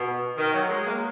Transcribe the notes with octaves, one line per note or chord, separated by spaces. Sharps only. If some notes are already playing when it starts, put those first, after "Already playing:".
Already playing: B2
D#3
F#3
G#3
A#3